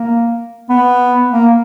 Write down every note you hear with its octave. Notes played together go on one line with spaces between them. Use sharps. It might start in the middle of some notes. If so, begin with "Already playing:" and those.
Already playing: A#3
B3
A#3